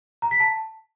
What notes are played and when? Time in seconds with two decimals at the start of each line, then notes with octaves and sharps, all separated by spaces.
0.22 A#5
0.31 B6
0.40 A5